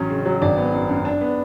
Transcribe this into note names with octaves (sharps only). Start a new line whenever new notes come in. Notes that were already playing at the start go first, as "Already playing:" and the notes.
Already playing: A1 F#3 C#4
C#3
F#3
G#1 D5
B3
F#2
F#2
D4
B3